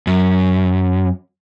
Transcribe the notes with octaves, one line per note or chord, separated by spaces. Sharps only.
F#2